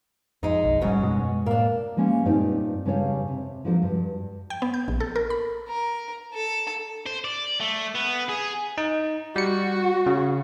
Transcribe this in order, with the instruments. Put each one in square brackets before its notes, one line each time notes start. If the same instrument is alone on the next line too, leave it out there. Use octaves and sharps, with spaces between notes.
[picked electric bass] F2 [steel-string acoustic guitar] G#3 D#4
[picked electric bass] F#1 B1
[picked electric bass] E1 G3 [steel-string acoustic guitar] G#2 C#4 F#4
[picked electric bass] F#2 B2 G#3
[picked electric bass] A2 [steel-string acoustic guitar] A#3 D4
[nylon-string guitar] G3 G#3 A#3 C#4
G2 A#2 C4 C#4 D#4 G4
G2 C#3 G3 D4 C#5 F5
C3
F3 F#3 D4 A4 A#4
G2
[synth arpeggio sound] G5
B3
G6
A#1
A4
A#4
B5
[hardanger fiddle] A#4
A4
[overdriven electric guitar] C5
D5
A3
B3
G#4
[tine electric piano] D#4
[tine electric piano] G3 C#7 [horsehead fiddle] F#4
[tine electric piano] C#3